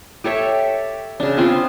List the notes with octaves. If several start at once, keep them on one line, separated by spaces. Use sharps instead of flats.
G4 A4 C#5 E5
C#3 D4
B3 C4 F4